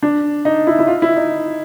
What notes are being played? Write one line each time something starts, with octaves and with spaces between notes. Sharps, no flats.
D4
D#4
E4
E4
F4
E4
D#4